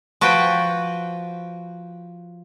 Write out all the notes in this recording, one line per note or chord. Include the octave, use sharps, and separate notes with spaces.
F3 F#4 B4 G5